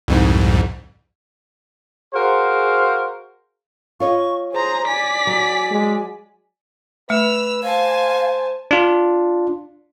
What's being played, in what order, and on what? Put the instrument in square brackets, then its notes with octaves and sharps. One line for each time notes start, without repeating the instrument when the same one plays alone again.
[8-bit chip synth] C2 F2 G#2
[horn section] F#4 G#4 A#4 C5 F5
[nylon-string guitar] F4 C#5 D#5 [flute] C#6
[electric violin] G#4 A#5 [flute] C5
[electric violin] D5 B6 [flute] G#5
[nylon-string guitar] F#3
[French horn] G#3
[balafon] A3 [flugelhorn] B4 [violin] E6 F7
[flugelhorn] C5 [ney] F5 [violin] G#5 A5
[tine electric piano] D4 F4